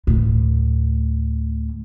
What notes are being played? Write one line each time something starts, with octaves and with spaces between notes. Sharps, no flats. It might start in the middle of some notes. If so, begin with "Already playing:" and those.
D2 A2